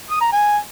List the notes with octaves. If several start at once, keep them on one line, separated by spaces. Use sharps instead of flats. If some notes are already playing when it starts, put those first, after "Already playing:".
D#6
A#5
G#5